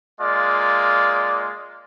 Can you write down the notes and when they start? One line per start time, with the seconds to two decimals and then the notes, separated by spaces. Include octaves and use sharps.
0.21 G#3 A#3 F4 D5